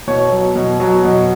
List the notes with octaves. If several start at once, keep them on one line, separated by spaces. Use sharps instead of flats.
B2 C#5
F#3
B2
F#3
B2